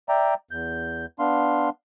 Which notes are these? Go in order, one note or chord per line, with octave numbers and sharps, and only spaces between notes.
D5 E5 G5 A#5
E2 G6
B3 D4 F5 C6